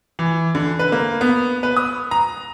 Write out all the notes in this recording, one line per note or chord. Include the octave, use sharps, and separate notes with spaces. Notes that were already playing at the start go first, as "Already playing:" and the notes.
E3
D3
B4
A#3
B3
B4
D#6
A#5